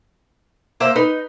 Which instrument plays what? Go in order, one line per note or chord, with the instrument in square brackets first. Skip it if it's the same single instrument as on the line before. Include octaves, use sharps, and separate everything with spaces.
[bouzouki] A#3 C5 E5
[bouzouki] D#4 [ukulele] B4